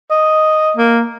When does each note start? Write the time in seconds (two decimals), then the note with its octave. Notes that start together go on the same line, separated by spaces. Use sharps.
0.11 D#5
0.77 A#3